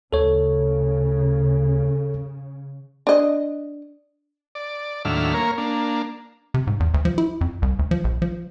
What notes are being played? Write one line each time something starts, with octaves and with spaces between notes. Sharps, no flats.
D2 C#3 A4 C#5
D4 D#5
D5
D#2 A2 F#3 D4 E5 F6
A#3 A#4 C#5
A#3 D4
C3
G#2
E2
D2
F3
E4
F2
C2
D2
F3
A#1
F3